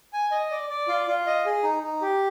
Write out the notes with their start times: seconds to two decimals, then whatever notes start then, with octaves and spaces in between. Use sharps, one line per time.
0.13 G#5
0.32 D#5
0.51 D5
0.70 D5
0.88 F4
1.08 F4
1.27 D#5
1.46 G#4
1.64 D#4
1.83 D#4
2.02 G4